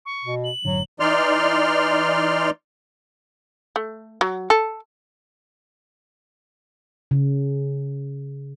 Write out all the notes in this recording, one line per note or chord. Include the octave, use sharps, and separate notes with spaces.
C#6
B2
F#7
F1 G#2 D3 F#3
E3 D#4 D5 C6 F6
A3
F#3
A4
C#3